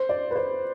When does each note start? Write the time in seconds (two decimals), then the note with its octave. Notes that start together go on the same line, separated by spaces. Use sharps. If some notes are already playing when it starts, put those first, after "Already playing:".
Already playing: C5
0.09 D5
0.31 B4
0.35 C5